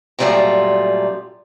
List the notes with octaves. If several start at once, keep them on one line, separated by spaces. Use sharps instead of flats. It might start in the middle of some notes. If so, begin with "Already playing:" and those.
F#2 A#2 G3 A3 F4 A#5